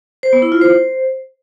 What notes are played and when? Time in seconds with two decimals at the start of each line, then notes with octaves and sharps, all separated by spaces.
0.23 C5
0.33 B3
0.42 E4
0.52 F4
0.61 C5